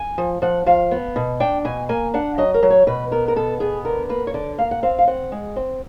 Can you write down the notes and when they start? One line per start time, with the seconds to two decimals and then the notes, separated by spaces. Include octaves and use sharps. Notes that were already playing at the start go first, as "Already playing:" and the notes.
Already playing: G#5
0.18 F3
0.42 F3 F#5
0.66 F3 F5
0.91 B3
1.16 B2
1.40 D4 G5
1.65 B2 G#5
1.89 A#3 G#5
2.14 D4 F#5
2.38 F#3 D#5
2.54 A#4
2.63 F#3
2.70 C#5
2.87 B2 B4
3.11 B3 A#4
3.28 A#4
3.36 B2 A4
3.60 B3 G#4
3.85 D3 A#4
4.09 A#3 B4
4.27 C#5
4.34 D3 D5
4.58 A#3 F5
4.71 F#5
4.83 C4 F5
4.99 F5
5.07 C4 F#5
5.32 G#3
5.56 C4